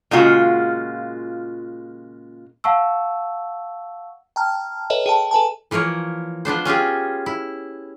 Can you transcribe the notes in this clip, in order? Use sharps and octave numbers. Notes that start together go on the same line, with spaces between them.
A#2 C#3 G#3 F4 F#4
F5 F#5 A5 C#6 E6
G5 A5 A#5 F6
A4 B4 C#5 D#5 E5
G#4 G5 A5
A4 B4 G#5 A5
E3 F3 A#3 A#4 C#5
F3 B3 D4 C5
C#4 F4 G4 G#4
E4